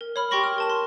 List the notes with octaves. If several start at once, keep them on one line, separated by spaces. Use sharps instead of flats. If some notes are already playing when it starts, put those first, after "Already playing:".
A#4
C#5 B5 F6
G4 G5 C6 C#6 A#6 F#7
F6
A#4 A5 E7
C6